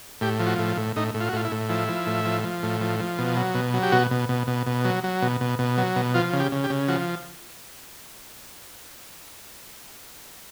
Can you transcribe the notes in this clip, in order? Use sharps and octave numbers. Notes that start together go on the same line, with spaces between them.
A2 G4
F3
F#4
A2
A2
A2 D#4
A2
F4
F#4
A2 F4
E4
A2
F3 E4
F3
A2
F3
F3
A2
F3
F3
B2
F#3
B2
F#3
G4
B2 F#4
B2
B2
B2
B2
F#3
F#3
B2
B2
B2
F#3
B2
F3 F4
C#3
G4
C#3
G4
C#3
F3 F#4